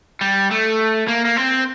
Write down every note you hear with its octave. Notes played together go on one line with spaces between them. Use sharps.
G3
A3
A#3
A#3
C4